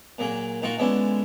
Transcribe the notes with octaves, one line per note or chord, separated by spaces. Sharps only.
A#2 F#3 A#3 G#4
A#2 D#4 F4 F#4 A#4 F#5
D3 G#3 B3 C#4 D4 E4